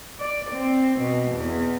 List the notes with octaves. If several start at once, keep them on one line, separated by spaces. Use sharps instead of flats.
D5
C4
B2
E2